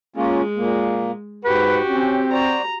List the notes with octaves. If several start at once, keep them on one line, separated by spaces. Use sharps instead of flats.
G#3 A#3 C#4 F4
A#2 A#3
G#2 F#4 G4 B4 F#5
C4 C#4
F#4 C5 D5 A#5